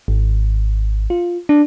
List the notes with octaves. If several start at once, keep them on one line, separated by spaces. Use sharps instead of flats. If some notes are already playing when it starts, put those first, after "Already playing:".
G#1
F4
D4